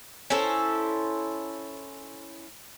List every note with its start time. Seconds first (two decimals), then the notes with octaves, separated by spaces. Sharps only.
0.30 C#4 E4 A4 C5